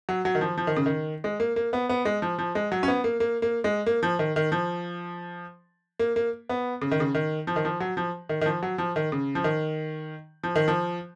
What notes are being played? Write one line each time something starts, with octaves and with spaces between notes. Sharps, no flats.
F#3
F#3
D#3
F3
F3
D#3
C#3
D#3
G#3
A#3
A#3
B3
B3
G#3
F3
F3
G#3
F#3
C#4
B3
A#3
A#3
A#3
G#3
A#3
F3
D#3
D#3
F3
A#3
A#3
B3
C#3
D#3
C#3
D#3
F3
D#3
F3
F#3
F3
D#3
D#3
F3
F#3
F3
D#3
C#3
F3
D#3
F3
D#3
F3